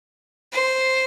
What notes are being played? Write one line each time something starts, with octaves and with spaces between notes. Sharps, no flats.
C5